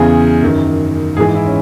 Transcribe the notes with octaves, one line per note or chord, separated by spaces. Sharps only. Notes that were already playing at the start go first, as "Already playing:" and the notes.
Already playing: E2 C#3 E3 G#4
F#2 D#3
G#2 E3 G#4
E4
C#4